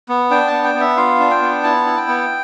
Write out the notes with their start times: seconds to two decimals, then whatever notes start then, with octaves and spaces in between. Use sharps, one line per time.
0.09 B3
0.30 D4 G5
0.47 B3 A5
0.64 G5
0.75 B3
0.81 E5
0.97 F4 F5
1.19 D4
1.31 G5
1.42 B3
1.63 E4 A5
1.86 E4
1.97 G5
2.08 B3